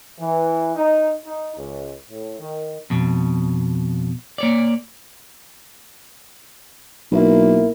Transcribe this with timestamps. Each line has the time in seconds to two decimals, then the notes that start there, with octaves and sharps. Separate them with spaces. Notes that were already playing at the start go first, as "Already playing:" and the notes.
0.19 E3
0.76 D#4
1.25 D#4
1.56 C#2
2.09 A2
2.39 D#3
2.90 F2 B2
4.38 A#3 C#5 D5
7.12 B1 A#3 E4